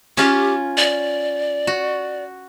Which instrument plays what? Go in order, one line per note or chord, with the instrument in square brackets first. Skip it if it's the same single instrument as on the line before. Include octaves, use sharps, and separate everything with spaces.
[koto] C#4 F4 [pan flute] G4
[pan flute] D5
[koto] F#4